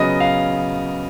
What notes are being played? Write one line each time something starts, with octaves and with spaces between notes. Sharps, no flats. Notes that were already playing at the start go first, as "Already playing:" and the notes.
Already playing: C#3 F#3 B3 D#5
F5